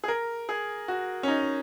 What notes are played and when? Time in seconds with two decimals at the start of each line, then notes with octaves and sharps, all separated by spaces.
0.04 G#4
0.08 A#4
0.49 G#4
0.88 F#4
1.23 C#4
1.28 D#4